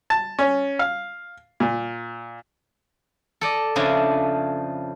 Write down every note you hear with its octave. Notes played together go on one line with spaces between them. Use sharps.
A5
C#4
F5
A#2
A4 D5 D#5
F2 C#3 F3 C#4 D4 E4